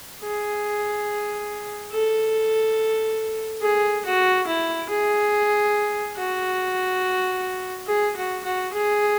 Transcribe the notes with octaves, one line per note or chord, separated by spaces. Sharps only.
G#4
A4
G#4
F#4
E4
G#4
F#4
G#4
F#4
F#4
G#4